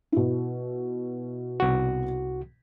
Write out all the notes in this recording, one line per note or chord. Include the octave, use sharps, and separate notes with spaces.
B2 E4
C2 F#4